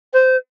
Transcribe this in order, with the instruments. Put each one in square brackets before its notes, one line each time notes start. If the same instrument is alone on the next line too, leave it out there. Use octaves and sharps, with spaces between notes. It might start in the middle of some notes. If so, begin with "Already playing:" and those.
[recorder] C5